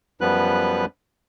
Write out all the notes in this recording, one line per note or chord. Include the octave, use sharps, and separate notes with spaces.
F#2 F3 G3 B3 B4 F#6